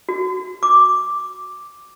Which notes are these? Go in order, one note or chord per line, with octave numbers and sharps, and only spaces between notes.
F#4
D6